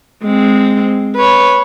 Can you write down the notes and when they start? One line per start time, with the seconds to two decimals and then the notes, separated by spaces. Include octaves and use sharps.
0.23 G#3 C4
1.16 B4 C#5